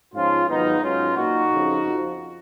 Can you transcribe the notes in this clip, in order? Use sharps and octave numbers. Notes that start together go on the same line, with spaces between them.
G#2 F3 C#4 F4
G#2 D#3 F#3 B3 D#4
G#2 F#3 C#4 F4
A#2 F#3 D#4 F#4
F2 C#3 F3
F2 F3